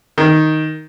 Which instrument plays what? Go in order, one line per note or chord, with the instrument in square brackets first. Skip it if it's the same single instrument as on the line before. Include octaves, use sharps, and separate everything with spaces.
[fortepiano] D#3